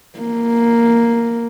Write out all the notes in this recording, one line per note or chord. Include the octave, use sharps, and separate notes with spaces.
A#3